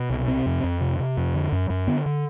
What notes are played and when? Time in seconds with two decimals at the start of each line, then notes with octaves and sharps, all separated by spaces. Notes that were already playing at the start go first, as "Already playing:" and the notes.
Already playing: B2
0.10 C2
0.28 C3 C4
0.46 F2
0.64 F2
0.81 C3
0.99 C3
1.17 F2
1.34 D3
1.52 F#2
1.70 F#2
1.87 D3 B3
2.06 D3